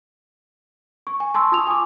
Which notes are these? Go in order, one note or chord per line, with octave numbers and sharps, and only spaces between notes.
C#6
G#5
A5 C6 C#6 E6
F4 D#6 F7
G#5 D6